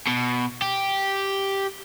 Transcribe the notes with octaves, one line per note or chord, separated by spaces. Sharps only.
B2
G4